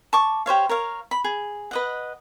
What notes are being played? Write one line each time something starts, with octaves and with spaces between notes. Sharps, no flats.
A5 C#6 D6
G4 C5 C#5 F5
A#4 C#5 F5
B5
G#4
B4 D#5 F#5